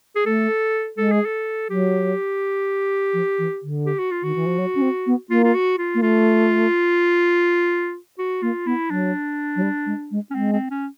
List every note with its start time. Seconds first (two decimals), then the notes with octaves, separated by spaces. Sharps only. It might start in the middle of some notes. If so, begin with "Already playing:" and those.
0.16 G#4
0.25 A3 A4
0.97 G#3 A4
1.12 G#4
1.26 A4
1.69 F#3 G4
3.13 F3
3.39 E3
3.63 D3
3.86 G4
3.99 F#4
4.11 F4
4.23 D#3 F#4
4.35 E3
4.46 F3
4.58 F#3
4.75 C#4
4.82 C4
5.06 B3
5.30 A#3 F4
5.44 F4
5.54 F#4
5.78 F4
5.95 A#3
6.02 A3 F4
8.18 F#4
8.42 A#3 F4
8.66 B3 E4
8.90 F#3 D4
9.56 F#3
9.62 G3
9.86 G#3
10.11 G#3
10.30 C#4
10.35 G#3 C4
10.53 C4
10.71 C#4